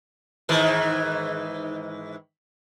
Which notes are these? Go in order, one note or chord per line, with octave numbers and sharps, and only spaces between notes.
G#2 D#3 E3